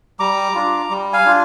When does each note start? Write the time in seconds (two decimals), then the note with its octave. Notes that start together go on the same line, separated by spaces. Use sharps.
0.19 G3 A#5 D6
0.55 D4 F4
0.90 G3
1.13 F5 G#5
1.25 D4 F4